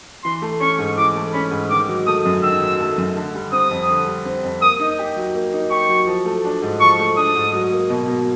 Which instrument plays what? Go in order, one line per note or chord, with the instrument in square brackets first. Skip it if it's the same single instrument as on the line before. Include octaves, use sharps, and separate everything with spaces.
[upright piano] E3 [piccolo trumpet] C6
[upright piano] A3
[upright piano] C#4 [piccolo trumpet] C#6
[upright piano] G#2
[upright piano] E3 [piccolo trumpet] D6
[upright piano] A3
[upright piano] C#4 [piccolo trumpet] B5
[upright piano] G#2
[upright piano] D#3 [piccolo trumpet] D6
[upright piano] F#3
[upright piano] A3 [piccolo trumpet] D#6
[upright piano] F#2
[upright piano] D#3 [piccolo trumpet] E6
[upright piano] F#3
A3
F#2
D3
G3
[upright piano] C4 [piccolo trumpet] D#6
[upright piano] F2
D3
G3
C4
F2
[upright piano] A#3 [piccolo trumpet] D#6
[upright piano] D#4
G4
F#3
A#3
D#4
[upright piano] G4 [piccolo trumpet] C#6
[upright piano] F#3
F3
A3
D4
G#2
[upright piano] F3 [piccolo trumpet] C#6
[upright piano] A3
[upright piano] D4 [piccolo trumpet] D#6
[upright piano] G#2
F#3
A#3
B2
B2